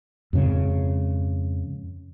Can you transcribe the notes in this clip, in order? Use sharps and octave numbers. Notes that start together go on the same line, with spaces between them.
F2 G#2 C#3